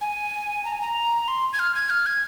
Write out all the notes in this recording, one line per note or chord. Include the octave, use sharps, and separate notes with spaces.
G#5
A#5
G#5
A#5
C6
G#6
F6
G#6
F6
G#6